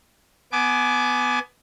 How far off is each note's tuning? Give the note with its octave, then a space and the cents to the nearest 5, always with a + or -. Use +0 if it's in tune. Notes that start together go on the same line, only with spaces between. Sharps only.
B3 +10 G#5 +25 D6 +0